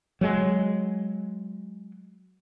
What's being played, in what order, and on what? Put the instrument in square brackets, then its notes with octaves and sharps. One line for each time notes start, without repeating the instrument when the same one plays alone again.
[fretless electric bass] F#3 G#3